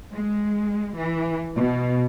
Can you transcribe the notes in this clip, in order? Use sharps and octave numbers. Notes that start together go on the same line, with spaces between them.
G#3
E3
B2